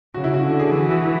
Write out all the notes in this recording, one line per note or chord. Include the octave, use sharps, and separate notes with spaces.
C#3 F#4
E4
F#4
D3
G#4
E3 F#4
F#4